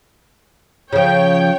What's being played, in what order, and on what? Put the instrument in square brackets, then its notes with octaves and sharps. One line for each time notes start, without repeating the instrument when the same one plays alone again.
[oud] C#3 F3 [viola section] C#5 G5